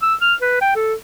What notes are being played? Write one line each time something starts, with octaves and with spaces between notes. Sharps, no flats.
E6
F6
B4
G5
A4